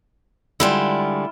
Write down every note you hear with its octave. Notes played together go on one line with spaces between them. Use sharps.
D3 G3 G#3 E4 F4